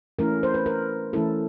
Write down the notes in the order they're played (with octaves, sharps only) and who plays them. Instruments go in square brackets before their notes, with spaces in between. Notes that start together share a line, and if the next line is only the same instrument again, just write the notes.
[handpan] E3 A3 C#4 E4 A#4
C5
B4
A#4
E3 A3 C#4 E4 A4